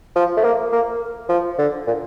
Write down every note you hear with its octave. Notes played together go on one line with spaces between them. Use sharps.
F3
A3
A#3
A#3
F3
D3
A#2